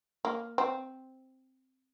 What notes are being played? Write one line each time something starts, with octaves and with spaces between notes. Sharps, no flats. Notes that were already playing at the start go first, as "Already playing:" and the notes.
A#3
C4